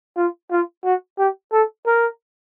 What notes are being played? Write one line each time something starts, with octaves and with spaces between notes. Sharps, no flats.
F4
F4
F#4
G4
A4
A#4